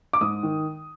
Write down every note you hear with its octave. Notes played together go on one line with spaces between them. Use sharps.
D6
G#2 D#6
D#3